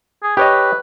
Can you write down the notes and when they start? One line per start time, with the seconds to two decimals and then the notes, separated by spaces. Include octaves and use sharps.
0.23 G#4
0.37 G4 B4 C#5 D#5